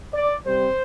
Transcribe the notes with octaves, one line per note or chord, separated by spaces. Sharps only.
D5
C3 G3 C4 C5